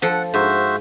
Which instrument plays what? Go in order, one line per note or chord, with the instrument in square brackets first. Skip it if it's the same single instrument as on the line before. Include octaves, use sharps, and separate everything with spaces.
[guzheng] F3 A4 [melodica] F#5
[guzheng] G#2 [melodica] F#4 C5 E5